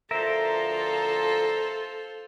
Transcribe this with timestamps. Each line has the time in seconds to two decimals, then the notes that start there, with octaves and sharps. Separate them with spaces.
0.11 D2 F3 F4 A4 A#4 C5 E5 A#5